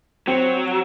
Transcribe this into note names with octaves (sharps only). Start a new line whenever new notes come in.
F#3 C4